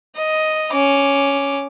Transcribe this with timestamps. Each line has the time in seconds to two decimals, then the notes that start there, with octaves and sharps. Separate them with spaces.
0.16 D#5
0.73 C#4 D6